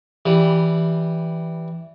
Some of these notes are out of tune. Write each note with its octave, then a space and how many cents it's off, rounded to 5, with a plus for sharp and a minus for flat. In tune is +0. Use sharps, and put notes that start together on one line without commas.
E3 +0 G3 +0